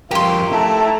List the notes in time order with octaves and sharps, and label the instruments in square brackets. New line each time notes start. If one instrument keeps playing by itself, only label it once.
[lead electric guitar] F2 A#4 [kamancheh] F4 [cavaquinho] G4 C6
[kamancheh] A3 A#5 [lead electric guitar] E4 [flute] A5